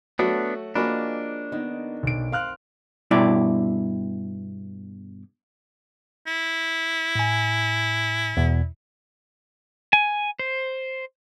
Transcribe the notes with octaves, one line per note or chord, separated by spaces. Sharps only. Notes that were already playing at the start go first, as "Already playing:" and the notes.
F#3 A3 B3 D4 F#4
F3 G#3 A#3 C#4 D4 F#4 B5
D#3 B3 D#4
B1 D7
C4 F5 F6 F#6
G2 B2 E4 D5
E4
A2 G#5
E2 B2
G#5
C5